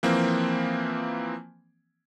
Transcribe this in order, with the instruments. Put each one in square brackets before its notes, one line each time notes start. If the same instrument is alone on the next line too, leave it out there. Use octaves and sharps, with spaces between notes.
[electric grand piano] E3 F3 A#3 C4